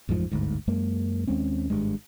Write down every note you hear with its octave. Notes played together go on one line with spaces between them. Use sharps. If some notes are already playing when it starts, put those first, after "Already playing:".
A1 F2 G#2 F3
G1 D2 G#2
F#2 G#3 A#3
D#2 G#3 C4 C#4
G#1 G2 G#3